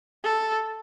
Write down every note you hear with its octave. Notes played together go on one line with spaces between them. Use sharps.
A4